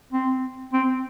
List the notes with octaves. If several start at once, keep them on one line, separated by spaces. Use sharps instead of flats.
C4
C4